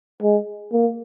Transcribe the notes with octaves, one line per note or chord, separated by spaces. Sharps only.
G#3
A#3